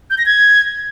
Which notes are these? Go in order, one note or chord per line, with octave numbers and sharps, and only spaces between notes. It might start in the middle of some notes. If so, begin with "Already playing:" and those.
G6
A#6
G#6